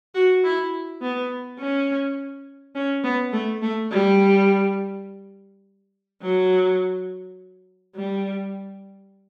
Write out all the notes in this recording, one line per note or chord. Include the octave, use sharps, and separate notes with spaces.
F#4
E4
B3
C#4
C#4
B3
A3
A3
G3
F#3
G3